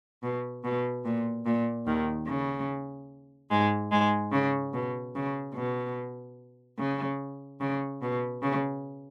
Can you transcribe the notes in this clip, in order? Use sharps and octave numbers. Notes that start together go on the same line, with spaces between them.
B2
B2
A#2
A#2
D#2 D#3
C#3
G#2 G#3
G#2 G#3
C#3
B2
C#3
B2
C#3
C#3
B2
C#3